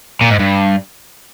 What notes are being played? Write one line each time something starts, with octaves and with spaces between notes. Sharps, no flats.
A#2
G#2
G2